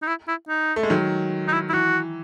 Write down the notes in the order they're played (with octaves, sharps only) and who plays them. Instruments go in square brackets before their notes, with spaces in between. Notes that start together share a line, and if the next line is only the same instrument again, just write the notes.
[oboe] D#4
E4
E4
D#4
[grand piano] A3
G#3
D#3 F#3
[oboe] D#4
E4
E4
[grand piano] E3 [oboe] F#4